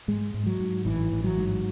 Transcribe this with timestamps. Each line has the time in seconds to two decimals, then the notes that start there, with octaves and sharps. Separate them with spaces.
0.08 G#2 G#3
0.34 G#2
0.46 F#3
0.60 G#2
0.85 A1 E3
1.12 A1
1.24 F#3
1.38 G#2